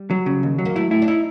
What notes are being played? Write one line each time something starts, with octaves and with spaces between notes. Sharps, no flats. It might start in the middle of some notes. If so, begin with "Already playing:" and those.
Already playing: G3
F#3
C#3
D#2
F#3
A#3
A3 E4
E4
D4
D#4 E4